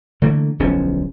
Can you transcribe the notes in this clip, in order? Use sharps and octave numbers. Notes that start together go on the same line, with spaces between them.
D3 E3 A3 A#3
D1 B1 F3 C#4